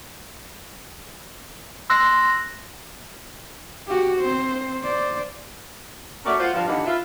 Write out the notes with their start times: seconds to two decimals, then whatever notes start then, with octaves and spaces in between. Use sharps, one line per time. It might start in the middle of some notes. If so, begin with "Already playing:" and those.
1.89 C6 E6 F#6 A#6
3.87 F#4 G4
4.20 C4 C5
4.80 C5 D5
6.25 A3 C#4 F#4 A#4 D5
6.39 F4 C5 F#5
6.54 G2 F3
6.67 D#2 D3 E3 A#3 D#4 F#5
6.86 F4 B4 E5